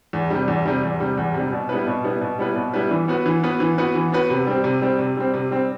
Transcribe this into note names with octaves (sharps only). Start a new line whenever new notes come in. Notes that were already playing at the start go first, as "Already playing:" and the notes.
E2
C3 G3
E2
C3 G3
E2
C3 G3
E2
C3
G3
B2
G3 B3 E4 B4
B2
G3 B3 E4 B4
B2
G3 B3 E4 B4
B2
G3 B3 E4 B4
E3
B3 F#4 B4
E3
B3 F#4 B4
E3
B3 F#4 B4
E3
B3 F#4 B4
C3
G3 C4
C3
G3 C4
C3
G3 C4
C3
G3 C4